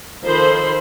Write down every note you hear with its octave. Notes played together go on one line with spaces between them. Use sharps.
D#3 F3 A4 C5 B5 C6